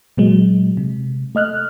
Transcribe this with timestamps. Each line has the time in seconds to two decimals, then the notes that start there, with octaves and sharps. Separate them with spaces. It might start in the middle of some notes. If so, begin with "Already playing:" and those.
0.17 A#2 F#3 G#3
0.77 C3
1.35 A3 D#5 F6 F#6